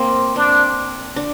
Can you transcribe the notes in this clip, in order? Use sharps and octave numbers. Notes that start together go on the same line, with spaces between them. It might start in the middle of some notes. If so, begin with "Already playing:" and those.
Already playing: A#3 C4
C4 D4
D4